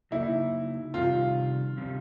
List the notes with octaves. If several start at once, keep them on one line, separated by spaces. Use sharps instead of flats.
C#3 F#3 A#3 D#4 E4
C3 D#3 G3 C4 F4
C3 D#3 G3 C4